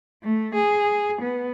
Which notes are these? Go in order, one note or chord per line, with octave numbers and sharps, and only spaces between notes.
A3
G#4
B3